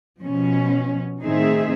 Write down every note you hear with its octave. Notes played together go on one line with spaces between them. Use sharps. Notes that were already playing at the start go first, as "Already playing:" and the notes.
B2 F3 C#4
A2 D#3 C4 D#4 G#4 E5